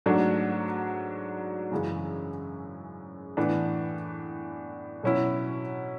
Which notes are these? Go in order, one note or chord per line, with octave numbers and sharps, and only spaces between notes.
G#2 F#3 A3 D4
F#2 C#3 E3 G#3
A2 E3 B3 D4
B2 F#3 C#4 E4